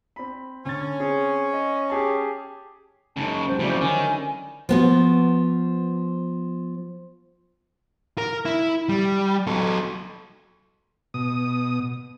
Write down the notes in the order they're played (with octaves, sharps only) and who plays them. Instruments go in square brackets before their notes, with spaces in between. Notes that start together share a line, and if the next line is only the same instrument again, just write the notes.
[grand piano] C4 B5
[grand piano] D3 A6 [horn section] C#4
[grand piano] C4 G#4
D#5
G4 G#4 A5
[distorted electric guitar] F#2 C#3 [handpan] G#3 D#4 [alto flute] A5
[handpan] F#3 G#3 G4 [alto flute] C5
[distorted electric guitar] F2 C#3 [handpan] E4 F#4 D5
[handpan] D3 C#4 [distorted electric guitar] D#3 [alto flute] G#5
[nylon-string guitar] F3 B3 F#4
[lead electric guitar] A#4
E4
G3
F#3 A4
[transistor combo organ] B2 D#6